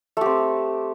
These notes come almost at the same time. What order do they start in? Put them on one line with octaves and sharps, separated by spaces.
A3 G4 C4